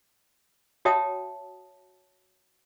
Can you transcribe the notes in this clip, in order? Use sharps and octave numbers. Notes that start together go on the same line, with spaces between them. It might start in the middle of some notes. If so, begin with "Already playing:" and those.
F#4 C#5 E5 G5 A5 D#6